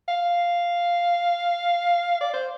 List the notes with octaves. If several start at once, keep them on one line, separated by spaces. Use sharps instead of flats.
F5
D5
C5